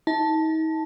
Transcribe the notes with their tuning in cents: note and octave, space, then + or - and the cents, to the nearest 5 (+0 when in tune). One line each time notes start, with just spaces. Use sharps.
D#4 +40 A5 +0